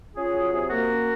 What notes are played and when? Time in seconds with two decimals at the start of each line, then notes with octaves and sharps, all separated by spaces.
0.15 C#4 F4 G#4
0.33 F#3
0.52 C3
0.69 A#3 F#4 A#4
0.89 C#4